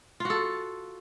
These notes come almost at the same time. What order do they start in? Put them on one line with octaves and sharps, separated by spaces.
F4 F#4 A4